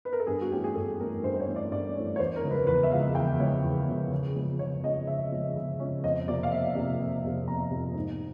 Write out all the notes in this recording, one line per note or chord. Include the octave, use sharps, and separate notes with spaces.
B4
A#4
A4
G2 G#4
F#4
E3 A3 C#4 G4
G#4
G2 A4
E3 A3 C#4 A#4
G2 C5
C5
C#5
E3 A3 C#4
D5
G2 D5
E3 A3 C#4 C#5
C#5
E2 C5
A#4
C#3 F3 G#3
B4
E2 B4
E5
C#3 F3 G#3 F5
E2 G5
C#3 F3 G#3 C#5
E2
C#3 F3 G#3
C#3
F3 G#3 C#4
C#3 C#5
F3 G#3 C#4 D#5
C#3 E5
F3 G#3 C#4
C#3
F3 G#3 C#4
F2 D#5
C3 F3 A#3 D5
F5
F2 E5
C3 F3 A#3
F2
C3 F3 A#3
F2 A#5
C3 F3 A#3
G#2